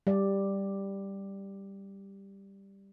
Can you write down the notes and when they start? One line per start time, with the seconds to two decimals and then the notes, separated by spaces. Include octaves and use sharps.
0.07 G3 D5